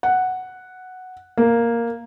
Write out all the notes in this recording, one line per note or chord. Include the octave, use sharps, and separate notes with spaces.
F#5
A#3